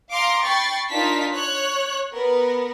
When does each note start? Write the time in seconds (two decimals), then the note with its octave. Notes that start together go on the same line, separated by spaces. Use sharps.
0.12 F5 A#5 C6 D6
0.45 G5 B5 C#6 A6 C7
0.90 D4 D#4 F4 A#4 A5 B6
1.33 C#5 F#6
2.13 B3 A#4 B4